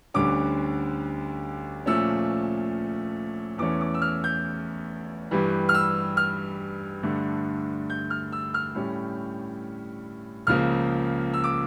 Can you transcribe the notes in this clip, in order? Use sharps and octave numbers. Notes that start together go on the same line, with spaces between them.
D2 D3 G3 C#4 D6
A#2 F3 A3 C#4 E6
E2 E3 A3 C#4 D6
D6
E6
F6
G6
G2 E3 G3
F6
E6
F6
G2 D3 A3
G6
F6
E6
F6
A2 G3 C#4
C#2 C#3 F3 A#3 F6
E6
D6